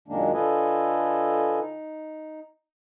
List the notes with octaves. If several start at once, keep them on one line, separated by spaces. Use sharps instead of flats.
F#2 A#2 D#3 G#3 A#3 D4
D3 F4 A4 B4 D#5 G#5
D#4